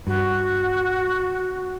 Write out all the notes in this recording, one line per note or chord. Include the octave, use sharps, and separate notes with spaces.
G2 F#4